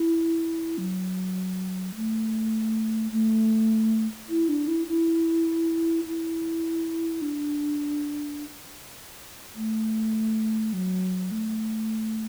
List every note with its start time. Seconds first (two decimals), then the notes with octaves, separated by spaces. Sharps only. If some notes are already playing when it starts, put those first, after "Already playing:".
Already playing: E4
0.78 F#3
1.95 A3
3.12 A3
4.29 E4
4.49 D4
4.68 E4
4.87 E4
6.05 E4
7.22 D4
9.56 A3
10.73 F#3
11.31 A3